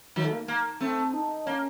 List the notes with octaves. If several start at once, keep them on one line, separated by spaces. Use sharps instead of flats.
D#3 F#3
A3
A#3
A#3
A3 C4
D#4
A#3 C#4